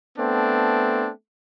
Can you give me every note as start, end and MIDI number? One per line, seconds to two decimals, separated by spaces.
0.18 1.09 57
0.18 1.09 59
0.18 1.09 60
0.18 1.09 62